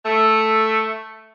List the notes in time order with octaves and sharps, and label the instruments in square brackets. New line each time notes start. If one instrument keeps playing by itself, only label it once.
[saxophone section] A3